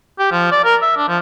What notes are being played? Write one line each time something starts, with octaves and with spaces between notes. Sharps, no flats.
G4
F3
D5
A#4
E5
D4
F3